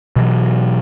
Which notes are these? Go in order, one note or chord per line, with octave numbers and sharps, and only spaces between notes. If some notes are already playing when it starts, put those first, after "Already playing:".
B2 E3 F#3